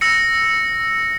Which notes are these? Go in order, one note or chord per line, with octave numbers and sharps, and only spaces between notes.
E6 A#6 C#7